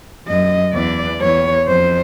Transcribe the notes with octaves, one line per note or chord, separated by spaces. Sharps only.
F#2 D#5
E2 D5
E2 C#5
F2 C5